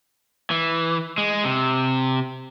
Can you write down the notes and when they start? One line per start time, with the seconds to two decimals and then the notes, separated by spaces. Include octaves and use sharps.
0.51 E3
1.18 G#3
1.44 C3